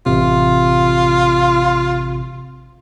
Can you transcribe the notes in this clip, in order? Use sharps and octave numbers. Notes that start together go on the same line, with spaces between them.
A1 C3 F4